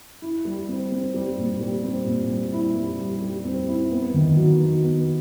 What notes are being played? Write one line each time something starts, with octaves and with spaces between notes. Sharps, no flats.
E4
G3
C4
C4
G3
A#2
G3
C4
A#2
G3
E4
G3
G3
G3
C4
E4
B3
D#3
F#3
B3
B3